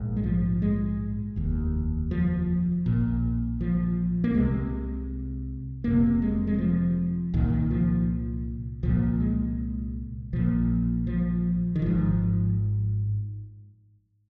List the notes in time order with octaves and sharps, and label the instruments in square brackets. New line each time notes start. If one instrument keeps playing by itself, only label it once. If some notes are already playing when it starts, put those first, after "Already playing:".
Already playing: [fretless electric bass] A#1 G#2
G#3
F3
G#3
F1 D#2
F3
A#1 A#2
F3
A#3
C2 C3 G#3
F1 F2 C3 A#3
G#3
G#3
F3
C2 A#2 D#3
D#3
F3
C2 A#2 F3
G#3
A#1 A#2 F3
F3
D#3
G#1 G#2 F3